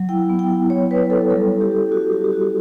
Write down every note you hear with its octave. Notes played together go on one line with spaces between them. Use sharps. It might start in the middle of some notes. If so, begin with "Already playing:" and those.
Already playing: F#3
E4 G5
B3
G5
E4
E4 C#5
B3 B4
E4 A4
G3 A4
C#4
G4
G3
G3 F#4
G3 G4
G4
G3 F#4